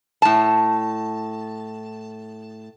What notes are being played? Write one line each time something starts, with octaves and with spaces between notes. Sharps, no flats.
A2 A5